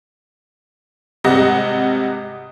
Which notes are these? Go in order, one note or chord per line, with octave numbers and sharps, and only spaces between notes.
G#1 C3 G3 D#5 F#5 A#6